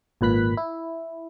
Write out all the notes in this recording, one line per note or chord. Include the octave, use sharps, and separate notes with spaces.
G#1 A#2 B4 F#6 B6
E4